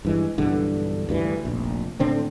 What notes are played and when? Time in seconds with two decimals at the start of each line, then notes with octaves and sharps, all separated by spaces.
0.05 G2 E3 G#3
0.38 B1 G2 D3 E3
1.09 D2 G2 E3
1.45 F1 A#1
2.00 A2 D3 C4 D4